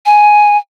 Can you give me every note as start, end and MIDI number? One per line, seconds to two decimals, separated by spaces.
0.06 0.57 80